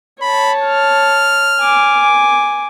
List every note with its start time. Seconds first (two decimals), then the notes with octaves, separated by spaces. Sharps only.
0.22 C#5 A5 B5
0.62 F6
1.60 G#5 D6